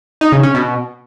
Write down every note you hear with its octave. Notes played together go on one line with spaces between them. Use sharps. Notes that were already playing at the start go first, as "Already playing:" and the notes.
D#4
C#3
C#4
B2